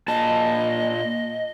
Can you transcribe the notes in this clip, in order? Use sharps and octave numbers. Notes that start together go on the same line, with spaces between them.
A#2 D#5 A5